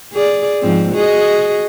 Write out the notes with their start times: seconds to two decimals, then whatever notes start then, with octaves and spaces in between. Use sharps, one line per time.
0.13 G#4 D5
0.61 G#2 F3 C4
0.93 F#4 G#4 D#5